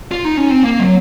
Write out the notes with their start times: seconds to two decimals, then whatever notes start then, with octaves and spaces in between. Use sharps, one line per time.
0.11 F4
0.25 D#4
0.37 C#4
0.50 C4
0.63 A#3
0.79 F#3